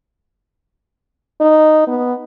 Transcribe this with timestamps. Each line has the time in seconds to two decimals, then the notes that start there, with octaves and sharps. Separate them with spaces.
1.41 D#4
1.87 B3